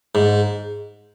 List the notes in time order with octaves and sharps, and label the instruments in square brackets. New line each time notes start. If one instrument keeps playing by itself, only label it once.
[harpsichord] G#2